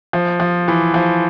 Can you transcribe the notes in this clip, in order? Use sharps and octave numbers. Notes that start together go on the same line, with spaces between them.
F3
F3
E3
F3